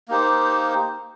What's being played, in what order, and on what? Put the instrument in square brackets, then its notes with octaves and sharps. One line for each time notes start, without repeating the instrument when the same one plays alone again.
[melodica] A#3 D#4 G4 C5